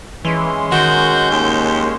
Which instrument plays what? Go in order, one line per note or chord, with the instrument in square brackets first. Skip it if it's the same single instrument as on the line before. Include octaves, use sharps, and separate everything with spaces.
[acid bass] E3 [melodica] G#3 C#4 C6
[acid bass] D#3 [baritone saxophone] F#4 [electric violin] G6
[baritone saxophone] D#2